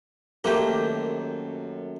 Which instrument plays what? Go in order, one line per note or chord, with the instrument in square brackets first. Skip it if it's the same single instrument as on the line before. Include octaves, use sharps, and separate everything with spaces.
[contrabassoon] F#2 [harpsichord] D#3 A3 C4 [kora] A#3 G4